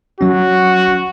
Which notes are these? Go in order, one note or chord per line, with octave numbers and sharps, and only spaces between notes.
F#3 C#4 F#4